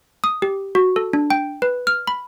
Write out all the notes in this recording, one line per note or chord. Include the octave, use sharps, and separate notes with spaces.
D#6
G4
F#4
A4
D4
G5
B4
F6
B5